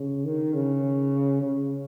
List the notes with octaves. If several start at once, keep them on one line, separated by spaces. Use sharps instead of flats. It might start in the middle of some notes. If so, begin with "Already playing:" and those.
Already playing: C#3
D#3
C#3
C#3